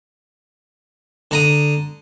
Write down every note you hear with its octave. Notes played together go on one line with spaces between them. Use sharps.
D3 A#5 D#6